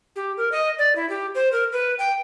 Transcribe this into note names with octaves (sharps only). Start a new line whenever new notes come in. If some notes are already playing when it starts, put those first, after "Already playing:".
G4
A#4
D#5
D5
E4
G4
C5
A#4
B4
G5